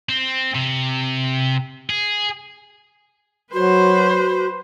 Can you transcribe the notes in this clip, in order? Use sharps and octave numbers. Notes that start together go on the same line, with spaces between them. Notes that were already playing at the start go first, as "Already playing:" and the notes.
C4
C3
G#4
F#3 F#4 B4 C5